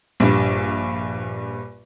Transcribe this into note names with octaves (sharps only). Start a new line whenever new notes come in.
A#1 G2